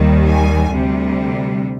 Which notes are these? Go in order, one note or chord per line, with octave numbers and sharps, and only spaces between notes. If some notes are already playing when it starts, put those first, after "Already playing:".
Already playing: D#2 D#3 G3
G#5
D2 C3 G3